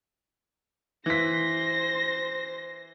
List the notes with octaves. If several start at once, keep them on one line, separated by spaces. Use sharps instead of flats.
E3 C5 C6 A#6 B6